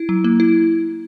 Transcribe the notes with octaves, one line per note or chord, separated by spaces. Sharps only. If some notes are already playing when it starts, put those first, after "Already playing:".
Already playing: E4
F#3
A#3
E4